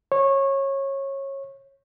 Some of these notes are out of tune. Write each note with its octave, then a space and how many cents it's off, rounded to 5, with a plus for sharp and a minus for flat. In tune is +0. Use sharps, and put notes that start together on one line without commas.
C#5 -20